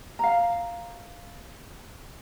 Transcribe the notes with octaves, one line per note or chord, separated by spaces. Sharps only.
F5 A#5